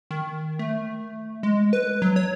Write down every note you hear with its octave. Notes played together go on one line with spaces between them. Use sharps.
D#3
A3
G#3
B4
F#3
C#5